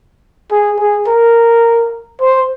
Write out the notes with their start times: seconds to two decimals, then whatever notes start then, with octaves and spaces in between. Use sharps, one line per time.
0.51 G#4
0.79 G#4
1.08 A#4
2.21 C5